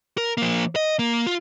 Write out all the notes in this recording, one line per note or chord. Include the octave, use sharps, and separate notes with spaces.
A#4
F3 A#3
D#5
A#3
F4